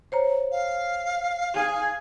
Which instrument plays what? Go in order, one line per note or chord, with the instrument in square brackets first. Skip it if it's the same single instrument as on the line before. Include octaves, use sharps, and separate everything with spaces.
[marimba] C5 C#5 A#5
[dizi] F5
[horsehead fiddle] G#4 G#5